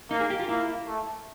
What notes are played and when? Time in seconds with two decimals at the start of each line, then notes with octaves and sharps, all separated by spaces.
0.11 A#3 D#4
0.20 G#4
0.30 G4
0.40 F4
0.49 A#3 E4
0.87 A3